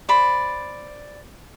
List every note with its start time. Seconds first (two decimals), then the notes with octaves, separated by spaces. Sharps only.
0.09 C5 D5 B5